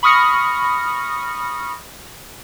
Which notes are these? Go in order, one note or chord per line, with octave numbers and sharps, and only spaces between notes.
B5 C#6 D#6 F6 A#6 C#7